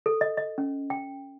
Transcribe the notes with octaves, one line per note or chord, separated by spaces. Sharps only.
A4
D#5
D#5
C#4
G5